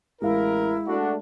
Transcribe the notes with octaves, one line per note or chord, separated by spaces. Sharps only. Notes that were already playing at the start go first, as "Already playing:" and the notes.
A1 G#3 E4 A#4 F5
A3 D4 F#4